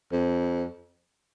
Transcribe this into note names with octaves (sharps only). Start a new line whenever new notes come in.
F2